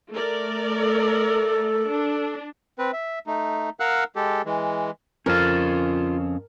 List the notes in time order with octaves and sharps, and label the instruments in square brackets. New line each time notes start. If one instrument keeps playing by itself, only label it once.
[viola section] A3 A#4 D5
[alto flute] A4
[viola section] D4
[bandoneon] C4 B4
E5
A3 D#4
A#4 F5 F#5 E6 F#6
G#3 G4 A4
E3 G#3
[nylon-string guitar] F2 [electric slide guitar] C#4 F5 [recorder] F4 [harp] A#4 F6 A6